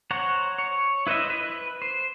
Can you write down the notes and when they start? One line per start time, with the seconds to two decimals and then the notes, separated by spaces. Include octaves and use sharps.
0.11 C5 C#5 F#5 A#5
0.58 C#5
1.07 E4 B4 C5 D#5 E5
1.30 B4
1.44 B4
1.82 C5